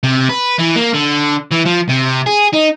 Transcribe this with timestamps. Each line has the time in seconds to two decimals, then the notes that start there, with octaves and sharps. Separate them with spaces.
0.03 C3
0.29 B4
0.59 E3
0.76 A#3
0.94 D3
1.52 E3
1.66 F3
1.89 C3
2.26 G#4
2.53 D#4